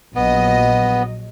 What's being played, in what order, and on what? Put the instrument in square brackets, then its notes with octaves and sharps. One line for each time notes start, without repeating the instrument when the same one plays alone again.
[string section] A#1 F#3 D#5 [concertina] B3